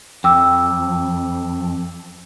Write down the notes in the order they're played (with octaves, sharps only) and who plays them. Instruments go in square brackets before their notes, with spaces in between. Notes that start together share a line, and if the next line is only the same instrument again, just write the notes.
[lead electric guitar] F2 [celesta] G5 D6 E6